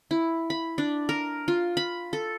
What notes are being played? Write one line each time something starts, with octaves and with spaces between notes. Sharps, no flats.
E4
B5
D4
A#4
F4
B5
A4